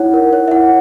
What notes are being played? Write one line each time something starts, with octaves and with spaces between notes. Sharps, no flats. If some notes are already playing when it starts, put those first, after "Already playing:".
Already playing: D#4 E4 C#5 F#5
A#4
C#5
E5
E4 F#5